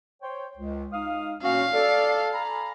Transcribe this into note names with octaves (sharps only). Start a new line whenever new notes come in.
C5 C#5 G5
C#2
D#4 F5 D#6
A#2 A#3 C#4 F#4 C#5 F5
A4 D5
G#5 A#5 B5